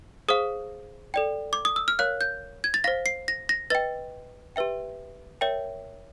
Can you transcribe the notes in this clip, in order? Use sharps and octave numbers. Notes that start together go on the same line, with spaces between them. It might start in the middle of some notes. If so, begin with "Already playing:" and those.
G#4 C5 F5 D#6
A4 D5 G5
D6
D#6
E6
F6
A#4 C#5 F5 F#6
G6
G#6
A6
C5 F5 A#6
C7
A#6
A#6
B4 D#5 G5 A6
G4 B4 E5 G5
A#4 C#5 E5 G5